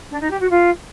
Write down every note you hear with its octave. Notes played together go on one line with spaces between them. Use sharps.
D4
D#4
G4
F#4
F4